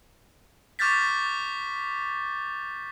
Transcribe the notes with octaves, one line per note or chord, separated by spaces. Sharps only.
C#6 D6 F6 G6 A6 B6